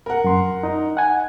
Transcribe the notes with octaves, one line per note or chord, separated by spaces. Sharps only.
A#4 F#5
F#2 C6
D#4 D#5
F#5 G#5